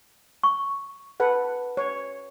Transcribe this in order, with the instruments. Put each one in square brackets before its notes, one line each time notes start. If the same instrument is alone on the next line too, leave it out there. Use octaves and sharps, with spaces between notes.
[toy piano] C#6
[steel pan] A4 B4 F#5
C#5